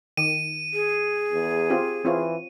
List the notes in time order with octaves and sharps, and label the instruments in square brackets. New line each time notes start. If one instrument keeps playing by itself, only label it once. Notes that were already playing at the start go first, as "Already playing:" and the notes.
[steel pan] D#3 [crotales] D#7
[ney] G#4
[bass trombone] E2
[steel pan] C4 F4 G4
[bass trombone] E3 [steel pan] C4 F4 C#5